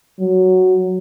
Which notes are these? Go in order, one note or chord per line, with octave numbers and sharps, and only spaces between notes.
F#3